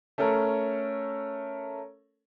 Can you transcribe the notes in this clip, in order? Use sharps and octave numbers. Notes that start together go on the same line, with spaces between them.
A3 C#4 A4 A#4